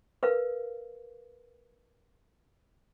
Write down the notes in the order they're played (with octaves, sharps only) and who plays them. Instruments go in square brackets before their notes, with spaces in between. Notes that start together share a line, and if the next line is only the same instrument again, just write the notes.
[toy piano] A#4 B4 F5